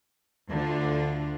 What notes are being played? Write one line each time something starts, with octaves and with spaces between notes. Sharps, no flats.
D2 D3 D4 F4